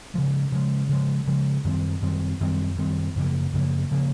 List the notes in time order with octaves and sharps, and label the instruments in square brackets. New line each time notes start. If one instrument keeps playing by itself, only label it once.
[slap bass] C#3 F3 G#3
C#3 F3 G#3
C#3 F3 G#3
C#3 F3 G#3
F#2 D#3 G3 C4
F#2 D#3 G3 C4
F#2 D#3 G3 C4
F#2 D#3 G3 C4
F#2 C#3 F3 A#3
F#2 C#3 F3 A#3
C#3 F3 A#3